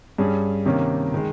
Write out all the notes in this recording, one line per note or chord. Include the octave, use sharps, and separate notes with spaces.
G2 G3 C#4 G#4
C3 D#3 A#3 C#4
D#3 G#3